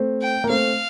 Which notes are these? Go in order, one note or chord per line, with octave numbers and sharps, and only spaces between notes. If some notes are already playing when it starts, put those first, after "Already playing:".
Already playing: A3 C4
G5
A#3
A3 C4 F5